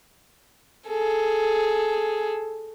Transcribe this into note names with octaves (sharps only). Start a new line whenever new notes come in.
G#4 A4